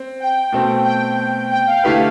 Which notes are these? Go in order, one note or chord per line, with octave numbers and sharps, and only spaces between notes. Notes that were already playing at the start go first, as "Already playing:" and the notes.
Already playing: C4
G5
B2 A3 C4
G5
G5
F5
D3 A3 E4 G4 B4 F5